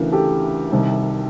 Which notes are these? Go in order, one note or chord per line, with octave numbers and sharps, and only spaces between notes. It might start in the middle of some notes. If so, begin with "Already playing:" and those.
Already playing: D2 C#3 E3 A#4
G4 A4
C2 C3 D#3